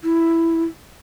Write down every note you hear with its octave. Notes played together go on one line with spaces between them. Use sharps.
E4